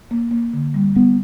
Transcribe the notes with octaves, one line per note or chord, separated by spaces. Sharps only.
A#3
A#3
D3
G3
G3 B3